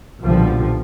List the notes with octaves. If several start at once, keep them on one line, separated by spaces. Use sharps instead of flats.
B1 A#2 D3 F3 G3